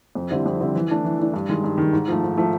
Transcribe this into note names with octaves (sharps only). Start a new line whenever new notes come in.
F2
D3 G3 C4 E4
F2
D3 G3 C4 E4
E3
A3 D4
E3
A3 D4
G2
D#3 G#3
G2
D#3 G#3
G#2
F3 A3
G#2
F3 A3